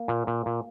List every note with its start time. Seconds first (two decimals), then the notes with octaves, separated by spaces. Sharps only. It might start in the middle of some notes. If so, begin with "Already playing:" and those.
Already playing: A#3
0.08 A#2
0.27 A#2
0.46 A#2